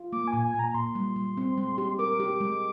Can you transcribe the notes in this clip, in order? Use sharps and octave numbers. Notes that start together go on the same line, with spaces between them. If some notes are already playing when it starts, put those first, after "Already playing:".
Already playing: F4
A#3 D6
G#5
A#2
G#5
A#2
A#5
A#2 C6
G3
G3
C4
G#3
G4
A#4 D6
G4
G#3